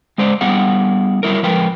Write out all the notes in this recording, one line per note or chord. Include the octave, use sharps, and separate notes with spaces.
G#3 C5 D5
G3 B3 E4 G#4 F#5
F#3 G3 E4 A#4
F3 G#3 A#4 B4 G5